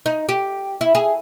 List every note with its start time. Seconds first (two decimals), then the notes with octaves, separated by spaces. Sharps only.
0.06 D#4
0.29 G4
0.81 E4
0.95 G#4